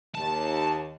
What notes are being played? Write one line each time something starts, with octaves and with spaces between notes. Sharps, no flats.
D#2 A5